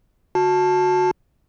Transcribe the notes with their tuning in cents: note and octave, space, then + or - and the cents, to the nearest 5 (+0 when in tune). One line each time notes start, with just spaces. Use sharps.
F#4 -15 A5 +0